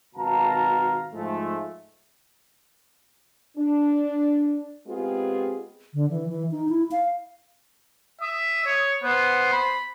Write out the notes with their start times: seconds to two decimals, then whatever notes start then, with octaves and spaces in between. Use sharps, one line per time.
0.15 G#1 B2 F5 A5 A#5
1.13 G#2 F3 G#3 A3
3.57 D4
4.86 G#3 B3 C4 F4 G4 G#4
5.94 D3
6.10 E3
6.29 E3
6.51 D#4
6.69 E4
6.91 F5
8.22 E5 D#6
8.66 C#5
9.03 B3 C5
9.52 B5